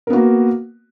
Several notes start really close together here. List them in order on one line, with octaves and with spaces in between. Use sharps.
A#4 B3 F#4 A#3